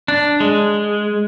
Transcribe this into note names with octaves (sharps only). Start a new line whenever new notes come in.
D4
G#3